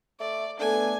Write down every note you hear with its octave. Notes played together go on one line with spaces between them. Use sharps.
A3 D5
A3 B3 D4 A4 G#5